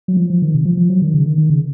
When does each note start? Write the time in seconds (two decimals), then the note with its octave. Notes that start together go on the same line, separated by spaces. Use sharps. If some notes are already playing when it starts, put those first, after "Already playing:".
0.08 F#3
0.17 F3
0.30 F3
0.42 D#3
0.54 C3
0.65 F3
0.77 F3
0.90 F#3
1.02 D#3
1.14 C#3
1.25 D#3
1.38 D#3
1.50 C#3